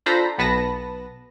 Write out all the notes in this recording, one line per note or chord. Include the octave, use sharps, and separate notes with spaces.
D4 F4 A4 C5 A#5 B5
B1 B3 B4 A5 A#6